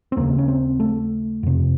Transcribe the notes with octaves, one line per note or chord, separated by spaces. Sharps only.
C4
D#2 C#3 A#3
C#4
C4
A3
F2 C3